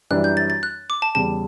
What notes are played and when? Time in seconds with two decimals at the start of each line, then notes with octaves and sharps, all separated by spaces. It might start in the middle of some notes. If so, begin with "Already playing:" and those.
0.11 F#2 E3 G3 D4 F#6
0.24 G6
0.37 A6
0.50 A6
0.63 F#6
0.90 D6
1.02 A5
1.15 E2 C#3 G3 A5